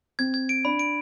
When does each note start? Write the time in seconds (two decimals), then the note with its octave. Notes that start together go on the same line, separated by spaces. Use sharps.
0.19 C4 G#6
0.34 G#6
0.49 D7
0.65 D4 B5
0.79 D7